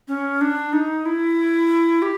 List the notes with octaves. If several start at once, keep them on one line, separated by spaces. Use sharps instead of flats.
C#4
D4
D#4
E4
G4